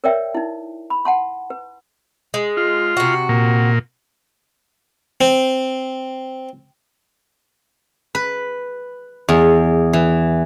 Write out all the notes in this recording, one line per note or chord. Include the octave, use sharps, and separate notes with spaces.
A#4 B4 C#5 D5 E5 G5
D#4 E4
B5
F#5 A5 C6
B4
G#3
F4
C3 F#4
A#2
C4
B4
E2
E3